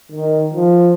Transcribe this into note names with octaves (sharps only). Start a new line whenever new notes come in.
D#3
F3